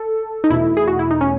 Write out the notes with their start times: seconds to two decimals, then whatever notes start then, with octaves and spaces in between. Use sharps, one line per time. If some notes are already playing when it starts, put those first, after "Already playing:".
Already playing: A4
0.44 D#4
0.50 E2 B2 A3 E4
0.77 G#4
0.87 F#4
0.99 E4
1.11 D#4
1.21 C#4